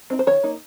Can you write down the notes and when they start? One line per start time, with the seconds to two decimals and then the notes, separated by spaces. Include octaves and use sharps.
0.10 C4 D#4
0.19 C5
0.27 D#3 C#5
0.43 A#3 D#4